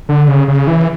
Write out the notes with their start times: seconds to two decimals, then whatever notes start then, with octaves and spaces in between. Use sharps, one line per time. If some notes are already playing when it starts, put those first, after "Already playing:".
0.09 D3
0.28 C#3
0.48 C#3
0.67 E3